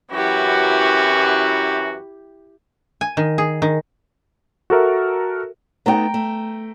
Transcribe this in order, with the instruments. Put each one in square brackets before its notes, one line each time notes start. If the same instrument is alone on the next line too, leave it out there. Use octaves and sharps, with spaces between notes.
[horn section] F#2 E3 F#4 [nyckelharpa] E4 G4
[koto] G#5
D#3
G#4
D#3
[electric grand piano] F#4 A4 A#4 E5
[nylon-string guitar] A3 B3 D#4 [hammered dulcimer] G5 A#5
[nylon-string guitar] A3